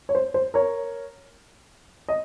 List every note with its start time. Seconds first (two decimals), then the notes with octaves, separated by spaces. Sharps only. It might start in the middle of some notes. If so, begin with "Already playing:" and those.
0.09 C#5
0.15 C5
0.34 C5
0.54 A#4 C#5
2.08 D#5